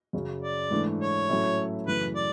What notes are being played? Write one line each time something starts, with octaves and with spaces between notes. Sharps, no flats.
F#2 C#3 F#3 C#4
D5
G#2 E3 A3 D4
C#5
A2 F#3 A3 C#4 E4
F#2 C#3 E3 A3 B4
D5